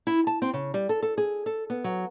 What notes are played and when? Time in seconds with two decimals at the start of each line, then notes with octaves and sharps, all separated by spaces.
0.07 E4
0.27 A5
0.42 C4
0.53 C#3
0.74 G3
0.89 A4
1.03 A4
1.18 G#4
1.46 A4
1.70 B3
1.84 F#3